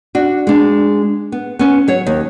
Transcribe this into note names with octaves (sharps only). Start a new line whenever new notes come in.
D4 F#4
G#3 D4
B3
B3 C#4
F#3 C#5
D#2